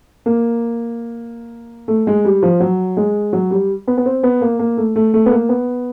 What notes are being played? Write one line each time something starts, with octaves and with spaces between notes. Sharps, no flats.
A#3
A3
G#3
G3
F3
F#3
G#3
F#3
G3
B3
B3
C4
B3
A#3
A#3
A3
A3
A3
B3
A#3
B3